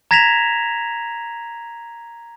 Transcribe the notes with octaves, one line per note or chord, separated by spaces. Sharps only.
A#5 G#6 A#6 B6 E7 F7